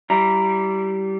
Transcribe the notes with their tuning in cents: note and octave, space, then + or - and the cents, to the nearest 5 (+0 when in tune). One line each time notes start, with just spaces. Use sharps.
G3 -20 E4 +10 A#5 +0